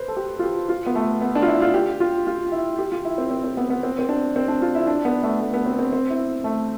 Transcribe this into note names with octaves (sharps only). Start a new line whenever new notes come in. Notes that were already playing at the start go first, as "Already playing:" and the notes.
Already playing: B4 C5
A4
G4
F4
G4
F4
B3
A3
B3
D4
F4
E4
F4
G4
F4
F4
E4
G4
F4
E4
C4
C4
C4
B3
B3
C4
C4
D4
C4
D4
F4
E4
D4
B3
A3
A3
B3
C4
C4
C4
E4
A3